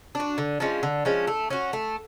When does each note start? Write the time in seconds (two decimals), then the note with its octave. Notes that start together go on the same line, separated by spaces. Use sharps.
0.15 D4 F#4
0.38 D3
0.60 F3 G#3 C#4
0.83 D3
1.05 F3 G#3 C#4
1.27 A3
1.50 C#4 F#4
1.73 A3